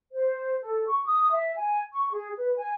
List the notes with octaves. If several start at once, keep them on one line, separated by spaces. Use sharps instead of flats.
C5
A4
C#6
D#6
E5
G#5
C#6
G#4
B4
G#5